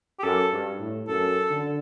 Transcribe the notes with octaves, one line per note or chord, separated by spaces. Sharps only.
G4
F#2 A4
G2
A2
F#2 A4
D3